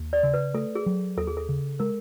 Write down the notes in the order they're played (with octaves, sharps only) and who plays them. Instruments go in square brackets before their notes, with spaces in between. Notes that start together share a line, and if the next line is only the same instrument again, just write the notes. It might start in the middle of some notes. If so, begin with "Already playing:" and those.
Already playing: [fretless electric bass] D#2
[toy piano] D5
[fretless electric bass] C#3
[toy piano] B4
[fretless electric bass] A3 [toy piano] A4
[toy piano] G#4
[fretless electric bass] F#3
[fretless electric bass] D#2 [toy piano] A4
[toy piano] G#4
A4
[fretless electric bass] C#3
[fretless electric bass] G#3 [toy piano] A#4